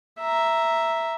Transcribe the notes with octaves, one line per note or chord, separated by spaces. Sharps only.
E5 A#5